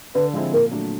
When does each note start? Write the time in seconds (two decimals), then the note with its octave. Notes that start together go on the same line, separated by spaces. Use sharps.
0.15 D3 B4
0.34 F3 G#3 C4 E4
0.53 A#2 A#4
0.71 F#3 A3 D4